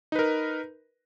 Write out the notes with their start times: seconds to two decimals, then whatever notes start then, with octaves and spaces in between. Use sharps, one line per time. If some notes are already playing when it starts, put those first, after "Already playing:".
0.12 D#4
0.15 B4
0.19 A#4